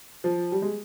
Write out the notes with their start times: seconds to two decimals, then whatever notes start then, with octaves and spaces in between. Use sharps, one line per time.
0.24 F3
0.52 G3
0.62 G#3